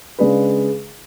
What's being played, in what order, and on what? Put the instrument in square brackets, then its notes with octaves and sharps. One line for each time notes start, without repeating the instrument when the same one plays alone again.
[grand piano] C#3 G#3 D4 G#4 B4